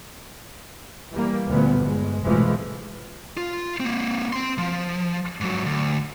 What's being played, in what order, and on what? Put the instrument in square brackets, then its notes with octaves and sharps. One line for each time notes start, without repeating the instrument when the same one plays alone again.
[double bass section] E3 G3 A#3
D2 A#2 F3 G3 B3
G1 G#3
F1 B1 A2 E3 F3 G#3
[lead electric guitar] F4
A#3 C4
C4 C6
F3
G#2 F#3
D2